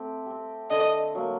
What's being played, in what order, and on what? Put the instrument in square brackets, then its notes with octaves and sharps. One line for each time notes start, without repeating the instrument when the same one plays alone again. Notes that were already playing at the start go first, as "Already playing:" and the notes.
Already playing: [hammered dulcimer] A3 C4 G4
C4 G4
[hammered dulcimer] D3 [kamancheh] D#5
[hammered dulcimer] F#3 A#3